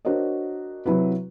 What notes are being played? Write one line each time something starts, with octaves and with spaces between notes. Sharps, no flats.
D4 F#4 A#4 C5 C#5 D#5
C3 F#3 E4 F#4 B4